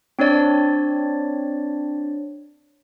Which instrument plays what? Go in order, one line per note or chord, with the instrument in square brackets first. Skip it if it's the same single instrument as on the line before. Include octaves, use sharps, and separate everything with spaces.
[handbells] C4 D4 C#5 D5